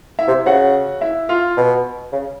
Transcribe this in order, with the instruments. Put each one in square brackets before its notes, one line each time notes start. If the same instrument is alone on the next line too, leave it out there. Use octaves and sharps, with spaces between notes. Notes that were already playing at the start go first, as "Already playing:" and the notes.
[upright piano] E4 E5
[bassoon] C3
[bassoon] C#3 [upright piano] F#4 F#5
[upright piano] E4 E5
F4 F5
[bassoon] B2
C#3